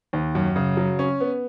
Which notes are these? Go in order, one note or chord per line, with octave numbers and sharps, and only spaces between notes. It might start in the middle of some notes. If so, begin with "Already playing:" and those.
D#2
F#2
C#3
F#3
C#4
B3